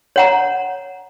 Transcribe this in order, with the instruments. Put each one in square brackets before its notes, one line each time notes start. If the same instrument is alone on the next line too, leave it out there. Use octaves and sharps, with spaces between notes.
[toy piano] C#5 F#5 A#5